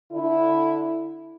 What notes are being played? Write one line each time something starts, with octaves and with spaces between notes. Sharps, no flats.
D3 E4